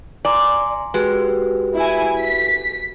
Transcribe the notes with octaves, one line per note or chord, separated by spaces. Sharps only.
D5 G#5 A#5 C6
G#3 F#4 G4 B4
E4 G#5
B6